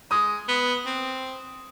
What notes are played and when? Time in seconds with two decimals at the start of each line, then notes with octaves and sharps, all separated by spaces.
0.11 G#3 D#6
0.48 B3
0.86 C4